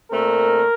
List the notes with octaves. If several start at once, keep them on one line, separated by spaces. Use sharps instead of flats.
A#2 A3 C4 A#4